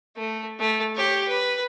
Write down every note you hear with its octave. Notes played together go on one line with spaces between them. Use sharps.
A3
A3
G4 C#5
B4